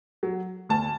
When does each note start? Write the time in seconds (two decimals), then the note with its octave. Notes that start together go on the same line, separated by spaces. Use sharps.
0.23 F#3
0.69 D2 A5